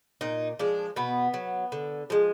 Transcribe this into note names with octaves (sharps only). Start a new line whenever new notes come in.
A#2 D#4
F3 G#3 D4
B2 B3
F#3
D3
F3 G#3